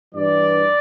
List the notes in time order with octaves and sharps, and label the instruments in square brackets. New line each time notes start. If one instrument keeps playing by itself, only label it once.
[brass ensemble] G2 E3 G3 D5